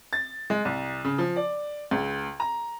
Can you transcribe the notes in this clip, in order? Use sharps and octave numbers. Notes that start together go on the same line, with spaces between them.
A6
G#3
C2
C#3
F3
D5
C#2
A#5